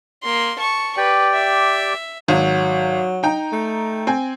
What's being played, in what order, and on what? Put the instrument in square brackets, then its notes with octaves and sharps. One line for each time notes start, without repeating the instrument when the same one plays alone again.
[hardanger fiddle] A#3 C6
A5 C#6
[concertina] G4 D5 G5 [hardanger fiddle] B4
[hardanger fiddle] E5
[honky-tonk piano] G#1 [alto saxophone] F#3
[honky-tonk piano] D#4 G5 A#5
[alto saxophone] A3
[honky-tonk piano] C4 G5 G#5